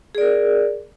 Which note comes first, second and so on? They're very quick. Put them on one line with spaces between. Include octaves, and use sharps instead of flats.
G#4 D5 A#4